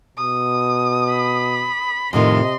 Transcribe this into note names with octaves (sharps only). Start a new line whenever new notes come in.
B2 D#6
B5
F2 A2 C3 D#3 D#5 C6